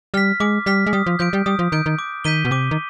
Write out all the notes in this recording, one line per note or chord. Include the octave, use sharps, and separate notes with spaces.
G3 F6 B6
G#3 D6
G3 F6 B6
G#3
G3 D#6
F3
F3 G6 D7
G3
G3 D#6
F3
D#3 G6 D7
D#3
D6
D#3 G6 B6 D#7 G7
B2
C3 D6
D#3